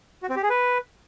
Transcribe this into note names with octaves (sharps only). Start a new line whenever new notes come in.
F#4
C4
G4
G#4
B4